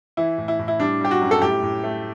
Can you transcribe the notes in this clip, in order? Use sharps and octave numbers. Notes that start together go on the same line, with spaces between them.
E3 E4
A2
E4
A2
E4
G3 D4
G3 G4
F#4
F#2
A4
A2 G4
A2
A3